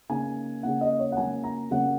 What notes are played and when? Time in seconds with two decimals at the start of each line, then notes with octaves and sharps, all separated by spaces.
0.09 C#3 A#3 D#4 G#5
0.63 C#3 A#3 D#4 F#5
0.81 D#5
0.99 C#5
1.12 F#5
1.17 C#3 F#3 A#3 C#4 G#5
1.44 A#5
1.70 C#3 F#3 A#3 C#4 F#5